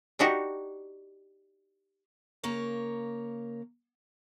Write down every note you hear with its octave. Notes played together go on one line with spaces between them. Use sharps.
D4 D#4 F#4 G4
C#3 A#3 A#4 C#5